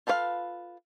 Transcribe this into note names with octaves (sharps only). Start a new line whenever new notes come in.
F4 A4 B4 C5 F5